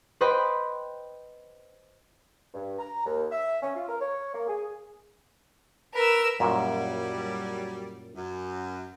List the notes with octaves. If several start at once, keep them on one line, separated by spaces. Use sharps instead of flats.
B4 C5 D#5 G5 B5 C6
G2
A#5
D#2
E5
C#4
F4
A#4
C#5
A#3
G#4
A#4 B4 E6
F#2 A#2 F#3 G3
F#2